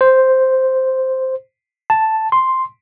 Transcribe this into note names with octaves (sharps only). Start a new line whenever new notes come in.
C5
A5
C6